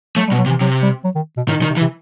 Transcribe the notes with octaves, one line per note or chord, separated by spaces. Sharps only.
F#3 A3
G3
B2
F#3
C3
E3
C3 F#3
G3
F#3
D#3
B2
A2 D#3
B2
D#3
C3
E3
C3